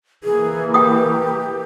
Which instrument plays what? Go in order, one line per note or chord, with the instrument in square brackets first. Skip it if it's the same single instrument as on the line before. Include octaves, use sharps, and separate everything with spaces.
[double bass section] E3 A#3 [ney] G#4
[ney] G4 [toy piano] G5 D#6